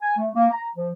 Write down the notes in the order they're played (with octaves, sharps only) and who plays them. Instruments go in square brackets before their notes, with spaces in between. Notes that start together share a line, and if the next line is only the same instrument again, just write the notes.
[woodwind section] G#5
A3
A#3
A#5
F3